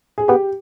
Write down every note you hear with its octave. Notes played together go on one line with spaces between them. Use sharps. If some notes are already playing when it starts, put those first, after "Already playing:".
G#4
B3 G4